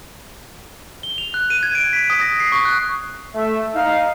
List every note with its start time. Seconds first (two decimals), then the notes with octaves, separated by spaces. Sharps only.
1.03 G7
1.18 F7
1.34 F#6
1.50 D#7
1.63 G#6
1.75 D7
1.93 B6
2.10 D#6
2.21 A#6
2.40 C7
2.52 C#6
2.65 F#6
3.35 A3 E5
3.75 D#4 F5